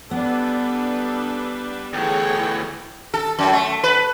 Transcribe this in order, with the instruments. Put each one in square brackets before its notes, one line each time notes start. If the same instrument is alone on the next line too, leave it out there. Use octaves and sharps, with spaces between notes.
[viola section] G3 D4 B4 [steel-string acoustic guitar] B3 [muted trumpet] A4
[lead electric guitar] D2 E3 [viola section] G#4 A4 C#5 [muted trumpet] G5
[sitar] A4
F#2
A3
B4